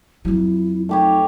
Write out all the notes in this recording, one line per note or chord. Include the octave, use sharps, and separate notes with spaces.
F2 F#3 E4
A3 D#4 G4 C#5